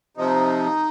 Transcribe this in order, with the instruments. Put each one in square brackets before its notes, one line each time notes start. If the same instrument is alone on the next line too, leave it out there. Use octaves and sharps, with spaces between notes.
[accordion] C3 F3 D#4